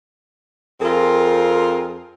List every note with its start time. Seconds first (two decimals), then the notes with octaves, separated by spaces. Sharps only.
0.81 F2 C4 F4 G#4 A#4